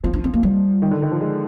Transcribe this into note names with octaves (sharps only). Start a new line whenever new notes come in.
F3 C4
D4
C4
A#3
G3
D#3
D3
D#3
F3
G#3